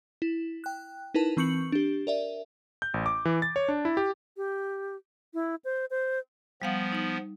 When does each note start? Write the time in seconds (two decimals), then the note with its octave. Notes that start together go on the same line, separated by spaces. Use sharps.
0.22 E4
0.64 G5 F#6
1.14 D#4 E4 A#4 B4 A5
1.37 E3 C4 C#6 G6 C#7 F#7
1.72 D4 G4
2.07 A#4 D5 E5
2.82 G6
2.94 A1
3.06 D6
3.25 E3
3.42 A6
3.56 C#5
3.68 D4
3.85 E4
3.97 G4
4.37 G4
5.34 E4
5.64 C5
5.90 C5
6.62 F3 G3 B3 F5 F#5
6.92 D#4 D#6